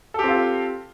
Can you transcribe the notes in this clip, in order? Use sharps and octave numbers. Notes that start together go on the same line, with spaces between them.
C4 F4 G4 A4